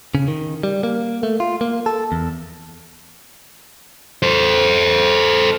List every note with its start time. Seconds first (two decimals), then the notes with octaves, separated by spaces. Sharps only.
0.15 C#3
0.28 D#3
0.63 G3
0.83 A#3
1.23 A3
1.40 F4
1.61 A#3
1.86 A4
2.12 E2
4.23 A4 C5